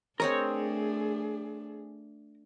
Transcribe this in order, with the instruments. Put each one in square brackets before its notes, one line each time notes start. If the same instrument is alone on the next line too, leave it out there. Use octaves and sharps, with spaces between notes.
[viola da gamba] A3 D4 [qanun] C4 C#5 D#5 [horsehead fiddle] G#4 [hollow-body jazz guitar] A#4